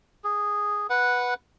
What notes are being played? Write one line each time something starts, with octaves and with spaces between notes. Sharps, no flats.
G#4
B4 F#5